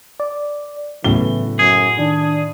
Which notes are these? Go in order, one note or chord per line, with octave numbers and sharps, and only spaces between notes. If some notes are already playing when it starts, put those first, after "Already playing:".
D5
A2 C#3 E3 F#3 B3 G7
F#2 G#4
D#3 D4